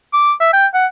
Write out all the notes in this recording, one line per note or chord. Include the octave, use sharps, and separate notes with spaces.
D6
E5
G5
F#5